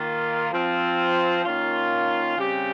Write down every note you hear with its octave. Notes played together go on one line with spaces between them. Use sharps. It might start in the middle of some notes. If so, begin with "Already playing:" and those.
Already playing: D#3 A#3 F4
F3 C4 F4
D#3 A#3 C#4 F4
C#3 G3 C4 G4